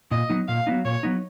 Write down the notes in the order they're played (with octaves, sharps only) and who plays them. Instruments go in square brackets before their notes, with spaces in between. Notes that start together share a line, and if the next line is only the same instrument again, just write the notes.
[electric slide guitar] A#2 [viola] D#5
[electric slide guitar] F#3 B3 D#4
[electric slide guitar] A#2 [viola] F5
[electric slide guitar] F#3 B3 D#4
[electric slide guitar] A#2 [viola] C#5
[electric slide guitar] F#3 B3 D#4